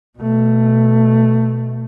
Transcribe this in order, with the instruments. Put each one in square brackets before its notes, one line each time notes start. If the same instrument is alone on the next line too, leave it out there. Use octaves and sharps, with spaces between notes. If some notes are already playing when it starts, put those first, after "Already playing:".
[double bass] B2 A3